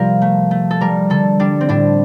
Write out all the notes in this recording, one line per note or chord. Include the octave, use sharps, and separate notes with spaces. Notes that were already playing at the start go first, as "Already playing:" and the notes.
Already playing: C3 F3 G3 F4 G4 A#4
A3
A3
A4
G3 A#4
D3 A4
G3 D4
C4
A2 D4